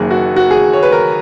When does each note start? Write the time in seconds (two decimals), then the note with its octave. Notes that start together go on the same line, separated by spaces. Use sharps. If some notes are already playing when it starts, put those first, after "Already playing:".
Already playing: F#1 F#2 D#3 A#3 G#4
0.11 F#4
0.36 F#4
0.51 G#4
0.73 C#5
0.83 B4
0.92 A#4